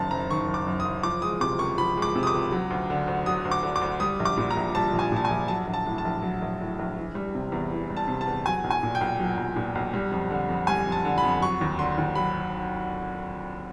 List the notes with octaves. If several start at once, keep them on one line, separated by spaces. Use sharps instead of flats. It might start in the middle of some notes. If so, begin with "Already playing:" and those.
Already playing: F#1 F#2 D#3 A5
F#1 A#5
D#3 C#6
F#1
D6
F#2
D#6
F#1
F3 D6
G#3 D#6
C3 D6
C#2 C#6
F3 B5
G#3 D6
C3
D#6
D6
C#2
F#3
D2
D3
D2
F#3 D#6
D2
D6
D3
D6
D2
G3 D#6
A#1
D6
A#2
A#5
A#1
G3 A5
A#1
G#5
A#2 A5
G#5
A#1
F#3 A5
A#1
A5
A2
A5
A#1
F#3
A#1
A2
A#1
E3
G3
C3
E2
E3
G3
A5
C3
A5
E2
F#3 G#5
B1
G#5
A#2
G5
B1
F#3
B1
A#2
B1
G3
F2
D3
F2
G3 G#5
F2
A5
D3
B5
F2
F#3 C#6
D#2
D3 C6
D#2
F#3 B5